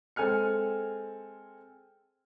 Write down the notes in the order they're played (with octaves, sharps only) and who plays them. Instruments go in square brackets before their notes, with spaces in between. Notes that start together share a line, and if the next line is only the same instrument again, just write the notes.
[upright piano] G#3 C4 A4 G#5 F6 C#7